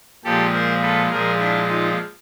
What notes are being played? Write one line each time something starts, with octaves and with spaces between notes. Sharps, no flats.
A#2 F3 G#3 G4 A4
A#4 C5
A4 B4
A#2 F3 G#3 G#4 A#4
D4 E4
D#4 F4